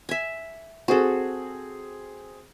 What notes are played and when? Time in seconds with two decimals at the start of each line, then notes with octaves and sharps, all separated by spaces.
0.09 E5 G#5
0.88 C4 F#4 G#4 A4